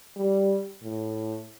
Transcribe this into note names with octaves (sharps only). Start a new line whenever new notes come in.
G3
A2